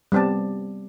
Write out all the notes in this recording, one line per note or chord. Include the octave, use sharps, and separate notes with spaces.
G3 B3 C4 D5 A5